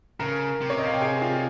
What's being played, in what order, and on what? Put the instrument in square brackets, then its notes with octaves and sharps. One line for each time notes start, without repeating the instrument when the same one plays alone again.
[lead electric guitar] C#3 [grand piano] A#4 A#5
[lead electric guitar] C3
[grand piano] C#5
D#5
F5
G5
G#4 G#5
F4 F5